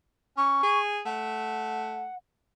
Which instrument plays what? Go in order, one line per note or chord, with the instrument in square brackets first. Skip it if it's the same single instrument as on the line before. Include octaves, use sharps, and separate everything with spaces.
[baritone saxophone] C#4 [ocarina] C#6
[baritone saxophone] G#4
[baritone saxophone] A3 [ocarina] F#5